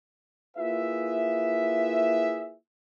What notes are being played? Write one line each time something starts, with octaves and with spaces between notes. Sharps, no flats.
A#3 E4 F4 G#4 B4 E5